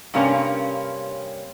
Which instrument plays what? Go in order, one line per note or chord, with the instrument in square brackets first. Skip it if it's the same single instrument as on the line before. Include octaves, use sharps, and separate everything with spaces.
[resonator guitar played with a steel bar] G2 C3 A#3 C#4